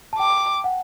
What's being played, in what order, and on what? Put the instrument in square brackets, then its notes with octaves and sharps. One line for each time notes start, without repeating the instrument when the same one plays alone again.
[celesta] A5
[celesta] G5 [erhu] D6
[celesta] F#5